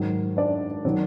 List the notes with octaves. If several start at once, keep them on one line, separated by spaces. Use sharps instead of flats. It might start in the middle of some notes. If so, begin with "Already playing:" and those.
Already playing: G#2 D#3 F#3
D4 D5
D#3 F#3